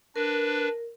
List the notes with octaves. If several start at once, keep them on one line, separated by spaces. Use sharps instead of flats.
D4 A#4 B4